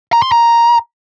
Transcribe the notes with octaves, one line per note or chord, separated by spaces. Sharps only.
A#5
C6
A#5